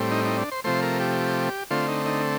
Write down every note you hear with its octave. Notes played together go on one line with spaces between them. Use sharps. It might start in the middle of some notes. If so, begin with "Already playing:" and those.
Already playing: A2 G3 C4
D#4
D#4
D4
C5
C3 F3 A3 C5
A#4
G4
D3 A3 C4 F4
D#4
D#4